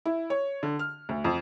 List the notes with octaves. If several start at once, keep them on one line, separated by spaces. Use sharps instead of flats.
E4
C#5
D3
F6
D2
F2